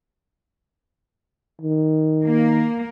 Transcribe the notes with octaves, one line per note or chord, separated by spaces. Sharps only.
D#3
A#3